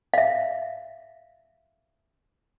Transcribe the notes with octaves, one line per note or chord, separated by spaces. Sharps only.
E5 F5